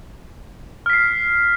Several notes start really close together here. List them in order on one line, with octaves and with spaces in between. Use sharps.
F6 B6 C7